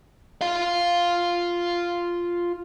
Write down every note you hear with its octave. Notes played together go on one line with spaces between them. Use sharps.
F4 F5